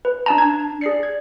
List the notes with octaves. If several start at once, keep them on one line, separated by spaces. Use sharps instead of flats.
B4
D4 A5 A#5
D4 A5 G#6
G#4 D5 C7 C#7
G#6